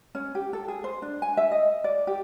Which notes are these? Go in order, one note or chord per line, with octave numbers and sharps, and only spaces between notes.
C#4
G4
A4
G#4
C5
D4
G#5
E5
D#5
D5
G4